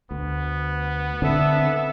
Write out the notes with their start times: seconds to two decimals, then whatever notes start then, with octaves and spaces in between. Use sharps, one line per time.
0.11 D2 B3
1.22 D3 C4 D4 A4 E5